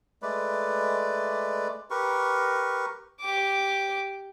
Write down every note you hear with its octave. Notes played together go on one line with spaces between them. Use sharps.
G#3 A3 B4 D5
G4 A#4 B4 C#6
G4 D6